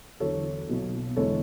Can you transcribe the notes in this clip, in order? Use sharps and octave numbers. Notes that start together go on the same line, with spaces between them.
E2 D3 F#3 A4 C#5
B1 B2 F#3
E2 D3 G#3 B3 A4 C#5